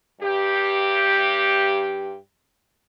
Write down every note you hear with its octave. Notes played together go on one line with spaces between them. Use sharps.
G2 G4